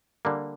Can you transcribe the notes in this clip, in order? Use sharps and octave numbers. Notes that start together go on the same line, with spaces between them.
D3 G3 A#3